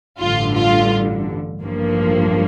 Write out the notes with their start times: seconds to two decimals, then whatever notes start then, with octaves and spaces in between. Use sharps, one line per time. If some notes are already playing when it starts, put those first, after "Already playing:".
0.18 A1 G2 D3 F4
0.55 F4
1.61 A1 G2 F3 A#3